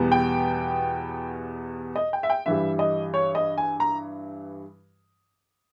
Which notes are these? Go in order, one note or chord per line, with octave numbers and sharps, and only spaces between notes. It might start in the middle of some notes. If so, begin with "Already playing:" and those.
Already playing: E2 B2 G3 B3
G5
D#5
G5
E5
G5
G2 E3 G3 E5
D#5
C#5
D#5
G#5
A#5